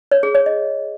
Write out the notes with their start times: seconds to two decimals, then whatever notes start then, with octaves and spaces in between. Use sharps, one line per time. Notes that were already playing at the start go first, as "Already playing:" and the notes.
0.11 C#5
0.23 G#4
0.35 C#5
0.46 D#5